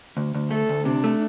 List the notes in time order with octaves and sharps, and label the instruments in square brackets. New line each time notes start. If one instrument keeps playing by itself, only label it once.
[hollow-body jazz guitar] D2
D2
[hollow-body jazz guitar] A3 [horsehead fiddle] A4
[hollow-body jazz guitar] D2
[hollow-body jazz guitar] C3 [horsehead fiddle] D4
[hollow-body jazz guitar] A3